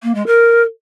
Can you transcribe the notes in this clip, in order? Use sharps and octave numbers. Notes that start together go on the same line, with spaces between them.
A#3
G#3
A#4